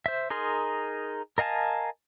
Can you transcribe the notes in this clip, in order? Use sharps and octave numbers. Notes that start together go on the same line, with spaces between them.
C5 E5
D#4 G#4 A#4 C6
A#4 D#5 F5 G#5 A5